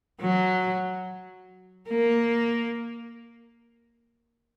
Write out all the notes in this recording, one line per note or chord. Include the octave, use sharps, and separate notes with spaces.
F#3
A#3